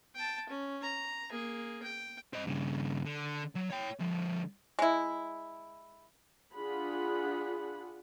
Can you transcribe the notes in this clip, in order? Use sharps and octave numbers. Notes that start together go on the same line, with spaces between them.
G5 A5
C#4
A#5
A#3 G#4
G5
C4 D#5
G2 C#3
D3
F#3
C#5 G5
D3 F3
G#3 E4
D4 F4 G#4 F#5 B5